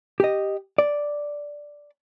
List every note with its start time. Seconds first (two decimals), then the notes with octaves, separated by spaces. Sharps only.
0.20 G4 D#5
0.78 D5